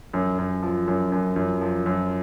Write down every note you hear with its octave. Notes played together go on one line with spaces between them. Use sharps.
F#2
F#2
F3
F#2
F#2
F#2
F3
F#2